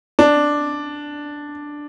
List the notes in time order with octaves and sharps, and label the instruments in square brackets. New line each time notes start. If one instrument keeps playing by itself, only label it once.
[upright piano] D4